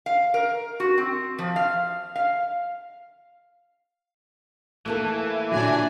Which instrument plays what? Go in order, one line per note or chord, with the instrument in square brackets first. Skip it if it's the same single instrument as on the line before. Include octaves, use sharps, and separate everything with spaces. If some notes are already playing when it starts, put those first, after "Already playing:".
[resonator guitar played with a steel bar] F5
A#4
F#4
C4
F3
F5
F5
[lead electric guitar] E3 [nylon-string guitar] A3 A#3 A4
[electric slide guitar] A#2 D3 F#3 [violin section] D4 D5 G#5